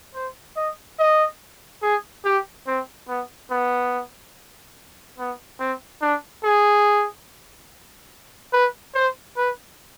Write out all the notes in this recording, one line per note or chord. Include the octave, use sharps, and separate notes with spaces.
C5
D#5
D#5
G#4
G4
C4
B3
B3
B3
C4
D4
G#4
B4
C5
B4